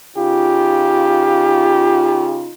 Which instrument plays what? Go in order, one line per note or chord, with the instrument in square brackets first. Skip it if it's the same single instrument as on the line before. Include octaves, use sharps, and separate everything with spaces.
[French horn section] C#3 D#4 F4 [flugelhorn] G4